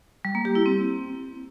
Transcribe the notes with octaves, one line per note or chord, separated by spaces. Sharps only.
G3
A#3
G4
E4
C4